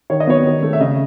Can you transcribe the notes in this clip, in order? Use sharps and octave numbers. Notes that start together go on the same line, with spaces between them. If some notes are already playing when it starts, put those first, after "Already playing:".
D#3 C#5
D#5
F#3 B3 C#5
D#3
A3
E5
C#3 D#5